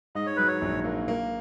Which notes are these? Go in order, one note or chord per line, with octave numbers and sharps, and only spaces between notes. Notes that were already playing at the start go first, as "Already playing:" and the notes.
G#2 D#5
C#5
F#3 B4
C#5
A#1
A#3
A#3